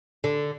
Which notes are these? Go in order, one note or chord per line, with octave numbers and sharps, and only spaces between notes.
D3